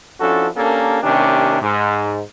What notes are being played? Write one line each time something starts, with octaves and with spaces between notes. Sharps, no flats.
F3 C#4 D4 E4 F#4 A4
A#3 C#4 D4 G4 A4 A#4
C3 D#3 A#3 C#4 D4 G4
G#2